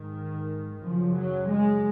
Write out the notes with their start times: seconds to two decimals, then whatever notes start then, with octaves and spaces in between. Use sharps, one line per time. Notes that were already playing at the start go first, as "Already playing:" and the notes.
Already playing: G#2 D#3
0.81 F#2 C#3 F3
1.16 F#3
1.49 G#3